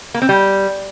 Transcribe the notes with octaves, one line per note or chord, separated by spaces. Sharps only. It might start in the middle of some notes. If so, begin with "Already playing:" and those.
A#3
C4
G3